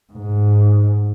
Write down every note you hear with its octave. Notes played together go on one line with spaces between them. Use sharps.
G#2